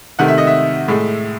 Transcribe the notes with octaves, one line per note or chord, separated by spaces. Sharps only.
C3 D#3 A3 F#5
E5
D#5
E5
A2 G#3